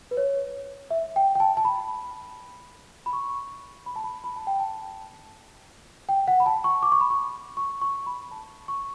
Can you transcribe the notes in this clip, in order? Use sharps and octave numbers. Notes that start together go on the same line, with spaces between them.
B4
C#5
E5
G5
G5
A5
A5
B5
B5
C#6
B5
A5
B5
B5
A5
G5
A5
G5
F#5
B5
A5
C#6
D6
C#6
B5
C#6
C#6
C#6
B5
A5
C#6